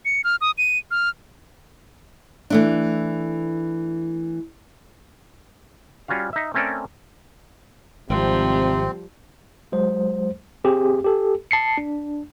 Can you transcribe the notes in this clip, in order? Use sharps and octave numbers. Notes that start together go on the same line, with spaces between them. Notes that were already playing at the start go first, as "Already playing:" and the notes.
C#7
F6
D#6
D#7
F6
E3 A3 D4
G3 C#4 F4 F#4 F5
D#4 E5
A3 C4 C#4 A4 A#4 D5
G#1 C3 F3 G3 C4
F#3 G#3 C5
C4 G4 G#4
G4 A4
A5 C7 C#7
D4